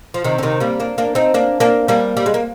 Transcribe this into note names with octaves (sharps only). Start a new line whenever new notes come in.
F3
C3 D#3
D3
C3 D#3
G3 A#3
A#3 D4
A#3 D4
C4 D#4
A#3 D4
A#3 D4
G3 A#3
G3
G#3
A#3